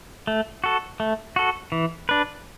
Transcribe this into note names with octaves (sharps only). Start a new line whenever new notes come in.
A3
F#4 A4
A3
F#4 A4
E3
D4 B4